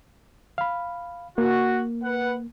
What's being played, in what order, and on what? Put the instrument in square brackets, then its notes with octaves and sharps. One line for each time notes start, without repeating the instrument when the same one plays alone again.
[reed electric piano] F5 B5
[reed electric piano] A#3 [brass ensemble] F#4
[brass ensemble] B4 F#5